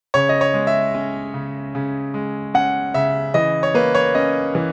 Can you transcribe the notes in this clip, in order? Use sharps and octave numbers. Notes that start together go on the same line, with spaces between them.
C#3 C#5
D#5
C#5
G#3
E5
C#4
C#3
C#3
G#3
C#4 F#5
C#3 E5
E3 D#5
C#5
A#3 B4
C#5
C#4 D#5
E3